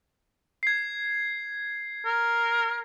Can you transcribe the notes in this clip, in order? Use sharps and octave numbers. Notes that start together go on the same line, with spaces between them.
G#6 C7
A#4